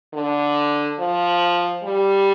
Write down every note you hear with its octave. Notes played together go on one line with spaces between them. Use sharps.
D3
F3
G3